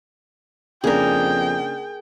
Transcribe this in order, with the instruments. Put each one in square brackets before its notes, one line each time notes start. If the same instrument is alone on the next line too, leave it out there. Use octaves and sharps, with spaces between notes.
[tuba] F2 [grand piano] C#3 A#3 D4 [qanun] G#4 A#4 [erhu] G5